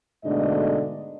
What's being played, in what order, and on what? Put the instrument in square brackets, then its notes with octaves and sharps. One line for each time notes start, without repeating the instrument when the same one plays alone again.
[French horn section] G#2 B2 D3 A3 D4 D#5